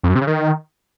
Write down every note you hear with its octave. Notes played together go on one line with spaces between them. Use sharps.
F2
F#2
C3
C#3
D#3